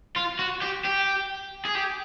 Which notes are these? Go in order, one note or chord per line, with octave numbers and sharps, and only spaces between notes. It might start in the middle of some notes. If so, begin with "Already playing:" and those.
F4
F#4
G4
G4
G#4
G4